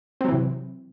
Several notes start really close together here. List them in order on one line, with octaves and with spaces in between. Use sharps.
C4 F#3 E3 C3